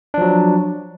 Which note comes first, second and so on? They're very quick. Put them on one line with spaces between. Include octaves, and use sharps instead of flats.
D4 F3 F#3